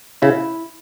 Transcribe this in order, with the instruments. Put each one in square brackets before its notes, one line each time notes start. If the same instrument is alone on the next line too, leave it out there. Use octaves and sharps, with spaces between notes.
[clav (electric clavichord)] C#3 [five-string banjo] E4